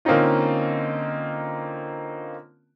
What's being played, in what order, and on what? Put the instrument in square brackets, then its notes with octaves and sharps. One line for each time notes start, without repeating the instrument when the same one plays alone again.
[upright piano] D3 A#3 C4 C#4 D#4 F4